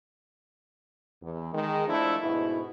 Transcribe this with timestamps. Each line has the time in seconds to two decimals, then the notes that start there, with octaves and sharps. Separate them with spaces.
1.21 E2
1.52 D#3 G#3
1.87 F3 A3 D4 E4
2.21 G#2 B2 E4